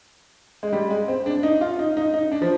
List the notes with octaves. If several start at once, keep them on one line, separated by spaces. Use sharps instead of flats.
G#3
G3
G#3
C4
D4
D#4
F4
D#4
D#4
D#4
D4
F3